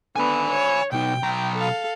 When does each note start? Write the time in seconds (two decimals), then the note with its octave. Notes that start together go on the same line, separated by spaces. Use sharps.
0.16 D3 B3 G#5 B5
0.50 C#5
0.92 B2 D#4 G5
1.23 B1 A#5
1.55 A4 F5